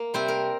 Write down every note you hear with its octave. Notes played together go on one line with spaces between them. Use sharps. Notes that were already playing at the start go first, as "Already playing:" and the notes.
Already playing: A#3
C3 G3 C4 C5
A#4